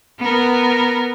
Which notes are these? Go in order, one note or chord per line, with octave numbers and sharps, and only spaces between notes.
B3 A#4